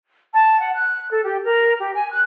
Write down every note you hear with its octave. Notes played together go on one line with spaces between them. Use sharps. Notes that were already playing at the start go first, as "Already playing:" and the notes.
A5
F#5
F#6
A4
G4
A#4
G4
G#5
F#6